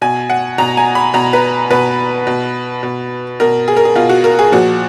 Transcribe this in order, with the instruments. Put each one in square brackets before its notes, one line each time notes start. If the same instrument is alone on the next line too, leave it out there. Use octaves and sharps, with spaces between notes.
[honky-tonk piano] B2 G#5
F#5
B2 A#5
G#5
B5
B2 A#5
B4
B2 B4
B2
B2
B2 A#4
G#4
A#4
G#4
B2 F4
F#4
A#4
G#4
A#2 F3 F#4